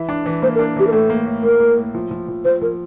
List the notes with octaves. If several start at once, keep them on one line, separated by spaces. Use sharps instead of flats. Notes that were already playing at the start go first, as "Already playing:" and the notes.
Already playing: E3 E4
D4
E3
A#3 C5
A#4
D4
E3 G4
A#4
A2 A4
A#3
A2
A#3 A#4
A#3
A2
F3
F3
F3
F3 C5
F3 A#4